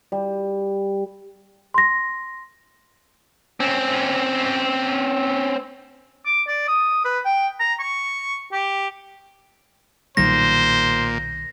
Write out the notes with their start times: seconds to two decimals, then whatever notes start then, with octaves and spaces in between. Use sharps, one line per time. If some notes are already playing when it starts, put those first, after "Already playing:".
0.12 G3
1.74 C6 A#6
3.60 C4 C#4
6.25 D6
6.48 D5
6.68 D#6
7.05 B4
7.25 G5
7.60 A#5
7.80 C#6
8.52 G4
10.17 B1 A#2 D#3 G3 C5 A#6